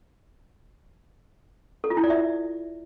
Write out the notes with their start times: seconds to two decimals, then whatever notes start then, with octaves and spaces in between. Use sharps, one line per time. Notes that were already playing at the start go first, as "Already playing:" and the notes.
1.84 A4
1.90 F4
1.97 E4
2.04 D5
2.10 E5